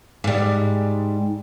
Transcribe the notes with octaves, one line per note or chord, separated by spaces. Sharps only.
G#2 G3